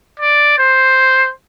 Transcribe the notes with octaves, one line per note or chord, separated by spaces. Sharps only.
D5
C5